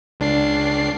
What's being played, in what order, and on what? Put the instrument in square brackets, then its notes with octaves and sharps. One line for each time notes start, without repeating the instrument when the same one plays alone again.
[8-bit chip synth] C#2 D4 C7